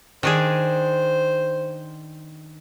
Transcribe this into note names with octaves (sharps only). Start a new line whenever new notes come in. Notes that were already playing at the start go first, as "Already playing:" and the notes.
D#3 D4 G#4 C5